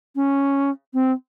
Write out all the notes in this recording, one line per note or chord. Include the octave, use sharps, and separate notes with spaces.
C#4
C4